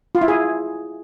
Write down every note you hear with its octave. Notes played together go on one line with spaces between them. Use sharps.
F4
E4
G#4